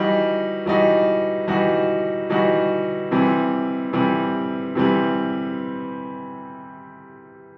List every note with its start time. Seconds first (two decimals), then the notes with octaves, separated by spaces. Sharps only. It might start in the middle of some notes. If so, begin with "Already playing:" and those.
Already playing: E3 G3 D#4 F#4
0.66 E3 G3 D#4 F#4
1.48 E3 G3 D#4 F#4
2.30 E3 G3 D#4 F#4
3.11 C3 E3 G3
3.93 C3 E3 G3
4.75 C3 E3 G3